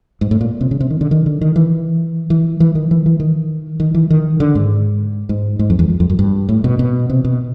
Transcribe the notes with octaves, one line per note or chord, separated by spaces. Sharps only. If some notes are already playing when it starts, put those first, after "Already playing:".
G#2
A2
A#2
C3
C#3
C3
D#3
D3
D#3
D3
D#3
E3
E3
E3
D#3
E3
E3
D#3
D#3
E3
D#3
D3
G#2
G#2
G#2
F2
E2
F2
F2
F#2
G2
A2
B2
B2
C3
B2